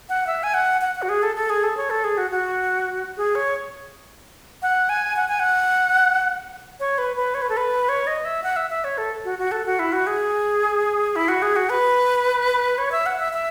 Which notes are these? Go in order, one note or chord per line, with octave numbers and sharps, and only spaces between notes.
F#5
E5
G#5
F#5
F#5
F#5
F#4
G#4
A4
A4
G#4
A4
C#5
A4
G#4
F#4
F#4
G#4
C#5
F#5
G#5
F#5
G#5
F#5
C#5
B4
B4
C#5
B4
A4
B4
C#5
D#5
E5
F#5
E5
E5
C#5
A4
F#4
F#4
A4
F#4
E4
F#4
G#4
E4
F#4
G#4
F#4
B4
C#5
E5
F#5
E5
E5